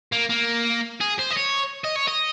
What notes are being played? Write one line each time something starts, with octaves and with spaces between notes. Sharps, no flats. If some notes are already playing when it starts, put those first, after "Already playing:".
A#3
A#3
G#4
C5
D#5
C#5
D#5
C#5
D#5